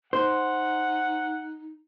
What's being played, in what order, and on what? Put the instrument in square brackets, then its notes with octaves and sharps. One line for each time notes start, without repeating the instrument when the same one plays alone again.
[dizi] D#4 [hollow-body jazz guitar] C5 [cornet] F#5